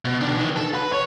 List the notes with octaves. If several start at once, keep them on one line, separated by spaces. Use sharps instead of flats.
B2
D#3 D4
D#3 E3
A4
B4
C#5